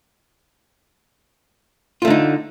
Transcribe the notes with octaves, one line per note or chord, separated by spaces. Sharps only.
D3 A3 D#4 F4